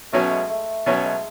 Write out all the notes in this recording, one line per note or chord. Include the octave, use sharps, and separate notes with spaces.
B2 F#3 A3 C#4
G#3
A3
B2 F#3 A3 C#4
G#3